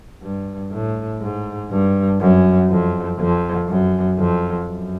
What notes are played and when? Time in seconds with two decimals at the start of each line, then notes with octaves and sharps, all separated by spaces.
0.22 G2
0.72 A2
1.21 G#2
1.70 G2
2.20 F#2
2.69 F2
3.19 F2
3.68 F#2
4.19 F2
4.68 F#2